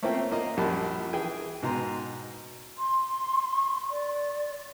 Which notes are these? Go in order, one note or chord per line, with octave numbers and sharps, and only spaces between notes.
A3 A#3 C4 C#4 F4 G5
A#3 F4 D#5
A#1 F#2 G3 A5
E3 G#4 G5 G#5
G#2 B2 A#5 C6
C6
D5